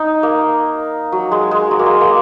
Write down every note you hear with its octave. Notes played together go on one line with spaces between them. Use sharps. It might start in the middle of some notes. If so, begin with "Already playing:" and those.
Already playing: D#4
A#3
F#3
G#3
G#3
F#3
A#3
G#3
A#3